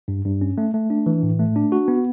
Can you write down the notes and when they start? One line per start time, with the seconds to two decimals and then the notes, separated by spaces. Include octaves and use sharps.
0.08 G2
0.25 G2
0.41 C#4
0.58 A3
0.74 A3
0.90 D4
1.06 E3
1.23 A2
1.39 A3
1.56 D4
1.72 F#4
1.88 B3